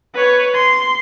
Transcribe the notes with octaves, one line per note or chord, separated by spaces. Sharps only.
B4 C#5
C6